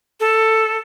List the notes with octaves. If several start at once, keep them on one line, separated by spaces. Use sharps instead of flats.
A4